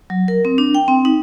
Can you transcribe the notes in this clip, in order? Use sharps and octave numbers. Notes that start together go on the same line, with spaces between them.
F#3
A#4
C4
D4
G5
C4
D#4